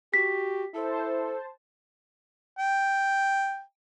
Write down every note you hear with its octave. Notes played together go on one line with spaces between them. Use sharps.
F#4 G4 B6
E4 A4 C5 A5
G5